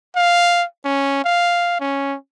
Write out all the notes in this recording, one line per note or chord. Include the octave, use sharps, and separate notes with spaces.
F5
C#4
F5
C#4